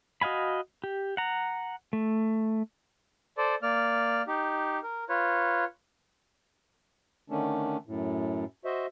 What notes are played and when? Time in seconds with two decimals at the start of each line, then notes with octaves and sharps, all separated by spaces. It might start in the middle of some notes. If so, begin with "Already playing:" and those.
0.21 F#4 D#5 F5 G#5 B5
0.84 G4
1.17 F#5 A#5
1.93 A3
3.38 A4 C5 D5
3.63 A#3 D5 F6
4.27 D#4 G4
4.83 A#4
5.09 F4 B4 C#5
7.30 D3 D#3 A3 C#4 D4
7.86 F#2 A2
8.65 F#4 C5 D#5 E5